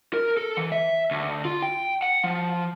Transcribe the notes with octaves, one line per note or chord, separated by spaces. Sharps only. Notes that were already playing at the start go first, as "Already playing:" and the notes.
A#4
A4
E3
E5
D2
F4
G5
F#5
F3